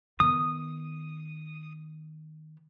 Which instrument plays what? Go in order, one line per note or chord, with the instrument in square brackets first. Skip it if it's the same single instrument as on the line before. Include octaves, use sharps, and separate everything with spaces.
[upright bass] D#3 B3 [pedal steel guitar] D#6